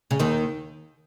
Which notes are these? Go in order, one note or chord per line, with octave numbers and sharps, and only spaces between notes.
C#3
D#2 D#3